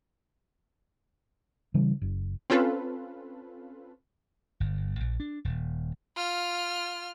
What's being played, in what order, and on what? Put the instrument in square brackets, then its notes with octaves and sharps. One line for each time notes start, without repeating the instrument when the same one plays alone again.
[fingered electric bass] C#3 E3 G3
F#1
[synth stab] C4 C#4 F4 A4 B4
[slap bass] G1
A#1
D4
D#1
[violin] F4 F6